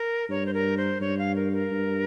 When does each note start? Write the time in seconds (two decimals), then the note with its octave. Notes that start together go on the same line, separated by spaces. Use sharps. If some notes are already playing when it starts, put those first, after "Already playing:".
Already playing: A#4
0.29 G2 C#5
0.46 C5
0.54 A#4
0.77 C5
1.01 G2 C#5
1.19 F5
1.36 A#4
1.53 A#4
1.71 G2